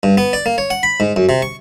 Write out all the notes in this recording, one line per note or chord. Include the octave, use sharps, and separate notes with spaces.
G2
B3
D5
A#3
C#5
F#5
B5
G#2
F#2
C3
C#6